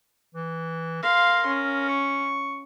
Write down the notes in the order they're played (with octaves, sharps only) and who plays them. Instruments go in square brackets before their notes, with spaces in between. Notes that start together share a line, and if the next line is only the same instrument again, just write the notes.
[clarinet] E3
[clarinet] A#4 [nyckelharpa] F5 C6
[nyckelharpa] C#4
[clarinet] C#6